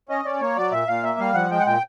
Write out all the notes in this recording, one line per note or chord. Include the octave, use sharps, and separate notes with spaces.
C#4 D#5
C#4 D5
A#3 C#5
F#3 D5
A#2 E5
A#2 F5
A#3 E5
G3 F5
F3 F#5
G#3 G5
F#5
A#2 G5